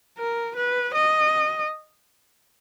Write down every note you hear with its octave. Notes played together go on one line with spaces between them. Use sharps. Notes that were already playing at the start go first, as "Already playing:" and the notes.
A#4
B4
D#5